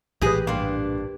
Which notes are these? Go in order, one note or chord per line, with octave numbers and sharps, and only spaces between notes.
A#1 A2 E3 G#3 G4 G#4 B4 G#6
G2 A#3 D4 G5 C6